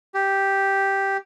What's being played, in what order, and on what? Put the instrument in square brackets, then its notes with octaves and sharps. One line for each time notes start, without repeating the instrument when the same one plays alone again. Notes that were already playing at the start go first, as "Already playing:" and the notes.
[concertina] G4